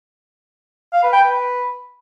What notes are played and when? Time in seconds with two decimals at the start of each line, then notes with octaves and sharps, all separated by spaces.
0.93 F5
1.03 B4
1.13 G5
1.22 B4